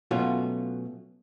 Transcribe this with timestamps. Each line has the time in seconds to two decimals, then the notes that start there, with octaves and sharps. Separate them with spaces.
0.11 B2 F#3 A3 C#4 F4 F#4